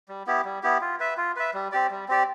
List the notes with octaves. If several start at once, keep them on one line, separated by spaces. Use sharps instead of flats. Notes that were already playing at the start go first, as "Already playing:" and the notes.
G3
B3 E4 G4
G3
B3 E4 G4
F4
B4 E5
F4
B4 E5
G3
C4 G4 D5
G3
C4 G4 D5